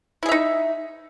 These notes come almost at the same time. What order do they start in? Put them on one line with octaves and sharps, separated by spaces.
E4 G#4 E5 D#4